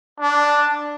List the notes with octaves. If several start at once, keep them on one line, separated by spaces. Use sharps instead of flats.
D4